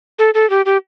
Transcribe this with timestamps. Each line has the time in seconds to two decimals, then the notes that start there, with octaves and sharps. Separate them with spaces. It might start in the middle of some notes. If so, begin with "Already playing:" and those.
0.19 A4
0.34 A4
0.50 G4
0.66 G4